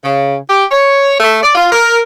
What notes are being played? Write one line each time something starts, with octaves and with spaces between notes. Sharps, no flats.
C#3
G4
C#5
A3
D5
F4
A#4